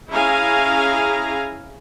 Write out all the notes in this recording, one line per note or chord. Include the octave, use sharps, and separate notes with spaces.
C#4 E4 G#4 F5 G#5 A#5